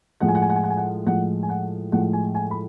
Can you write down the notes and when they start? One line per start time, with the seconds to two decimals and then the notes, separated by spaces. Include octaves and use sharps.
0.20 A2 F3 G#3 F#5
0.28 G#5
0.35 F#5
0.42 G#5
0.50 F#5
0.56 G#5
0.63 F#5
0.70 G#5
0.77 F#5
1.07 A2 F3 G#3 F#5
1.43 G#5
1.49 F#5
1.92 A2 F3 G#3 F#5
2.13 G#5
2.35 G#5
2.51 B5